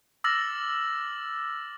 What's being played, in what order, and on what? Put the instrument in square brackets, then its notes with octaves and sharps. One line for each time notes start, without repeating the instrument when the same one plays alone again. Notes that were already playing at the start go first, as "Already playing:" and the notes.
[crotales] D6 E6 F6 A6 A#6 F#7